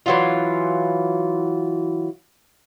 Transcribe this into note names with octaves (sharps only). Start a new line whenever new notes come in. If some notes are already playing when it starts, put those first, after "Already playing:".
E3 F#3 F4